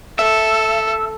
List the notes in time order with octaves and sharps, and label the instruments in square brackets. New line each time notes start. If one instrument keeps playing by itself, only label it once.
[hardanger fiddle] A4 [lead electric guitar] E5